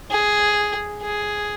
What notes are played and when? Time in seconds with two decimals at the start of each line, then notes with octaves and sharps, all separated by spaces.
0.11 G#4
1.02 G#4